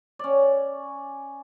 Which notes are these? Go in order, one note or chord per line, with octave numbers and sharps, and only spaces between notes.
C#4 D5